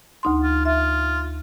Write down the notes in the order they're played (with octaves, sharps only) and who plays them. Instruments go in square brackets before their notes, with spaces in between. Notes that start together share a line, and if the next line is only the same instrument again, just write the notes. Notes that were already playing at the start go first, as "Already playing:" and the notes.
[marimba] D2 D#4 C6
[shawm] F4
[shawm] F4 [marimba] E5